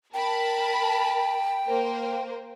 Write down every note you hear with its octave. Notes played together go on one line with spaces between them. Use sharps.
A#4 G5 A5 B5
A#3 A#4 C5